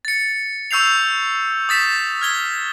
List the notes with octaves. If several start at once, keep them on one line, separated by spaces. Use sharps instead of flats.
A6 C#7
C#6 E6 G6 C7 F7
D#6 A6 B6 E7
F6 G#6 G7